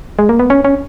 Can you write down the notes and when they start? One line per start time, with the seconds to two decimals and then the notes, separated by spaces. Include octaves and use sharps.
0.19 G#3
0.29 A#3
0.39 B3
0.50 C#4
0.65 C#4